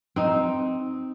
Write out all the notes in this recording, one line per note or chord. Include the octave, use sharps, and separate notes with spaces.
C4 D#4